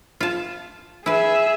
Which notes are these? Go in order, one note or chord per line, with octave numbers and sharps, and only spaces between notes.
F4 A5
E4 G#4 B4 E5